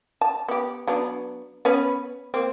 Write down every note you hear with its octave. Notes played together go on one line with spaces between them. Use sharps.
A5
B3 G4
F#3 B3 D4
B3 C#4 B4
A#3 C4